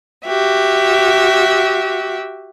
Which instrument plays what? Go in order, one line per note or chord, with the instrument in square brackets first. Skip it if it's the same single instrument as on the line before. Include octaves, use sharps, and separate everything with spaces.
[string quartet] F#4 G4 E5